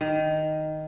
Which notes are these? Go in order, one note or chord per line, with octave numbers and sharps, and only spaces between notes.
D#3